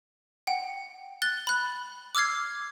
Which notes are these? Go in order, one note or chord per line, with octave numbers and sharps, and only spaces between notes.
F#5 G5
F#6 A6 G7
B5 F#6
D6 E6 F6 G#6 C7